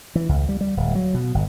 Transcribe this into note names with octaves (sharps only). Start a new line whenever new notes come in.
E3
C#2
G3
G3
D1
F#3
B2
G1